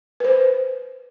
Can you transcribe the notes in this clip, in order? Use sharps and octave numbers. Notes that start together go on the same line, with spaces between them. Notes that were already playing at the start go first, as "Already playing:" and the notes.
B4 C5